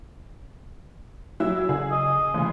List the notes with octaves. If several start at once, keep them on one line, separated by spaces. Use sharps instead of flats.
F#3 E4 E6
C#3 G#4
D#5
C#3 E3 G#3